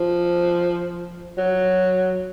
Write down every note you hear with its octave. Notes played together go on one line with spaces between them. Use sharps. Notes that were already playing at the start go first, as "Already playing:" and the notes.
Already playing: F3
F#3